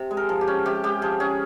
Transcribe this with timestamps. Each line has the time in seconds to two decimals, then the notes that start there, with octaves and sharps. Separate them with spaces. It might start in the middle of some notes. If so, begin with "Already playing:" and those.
Already playing: C3
0.11 G#3
0.17 A#4
0.29 F3
0.41 G4
0.47 C#4
0.66 C3 G4
0.84 G#3 G4
1.02 F3 G#4
1.20 C#4 G#4